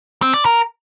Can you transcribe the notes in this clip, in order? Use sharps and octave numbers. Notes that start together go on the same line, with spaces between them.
C4
D5
A#4